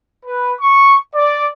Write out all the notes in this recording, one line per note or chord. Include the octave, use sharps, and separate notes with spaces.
B4
C#6
D5